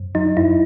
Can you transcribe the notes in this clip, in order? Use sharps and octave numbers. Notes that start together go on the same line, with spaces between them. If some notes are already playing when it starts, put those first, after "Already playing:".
Already playing: F#2
F#3 D#4
F#2 E4